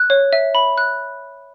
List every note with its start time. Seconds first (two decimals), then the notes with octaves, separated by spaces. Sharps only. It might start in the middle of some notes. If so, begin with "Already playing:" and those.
Already playing: F#6
0.10 C#5
0.33 E5
0.55 B5
0.78 F#6